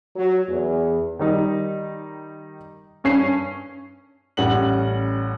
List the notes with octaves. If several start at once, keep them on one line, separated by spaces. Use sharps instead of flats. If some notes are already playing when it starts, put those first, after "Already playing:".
F#3
E2
D#3 G3 D#4
G2 C#4 C7
A1 G3 C#4 F#5 F#7